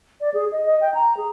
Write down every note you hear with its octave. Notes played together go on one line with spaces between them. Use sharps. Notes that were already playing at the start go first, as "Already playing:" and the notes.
D5
G#4
D#5
D#5
G5
A#5
G#4